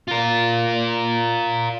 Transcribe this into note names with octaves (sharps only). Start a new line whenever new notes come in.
F4 A#4